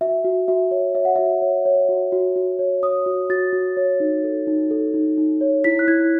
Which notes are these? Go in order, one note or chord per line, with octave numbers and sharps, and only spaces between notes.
F#4 E5
F#4
F#4 E5
C#5
C#5 E5
F#5
F#4 E5
C#5
C#5
F#4
F#4
F#4
C#5
C#5 D#6
F#4
F#4 A6
F#4
C#5
D#4
A4
D#4
A4
D#4
D#4
C#5
E4 B6
F#6
E4 G#6